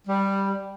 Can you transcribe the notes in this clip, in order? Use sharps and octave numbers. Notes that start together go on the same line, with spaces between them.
G3